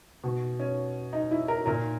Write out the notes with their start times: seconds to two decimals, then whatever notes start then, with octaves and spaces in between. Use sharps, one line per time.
0.24 B2
0.60 C#4
1.13 D#4
1.31 E4
1.48 A#4
1.66 A#2 A#4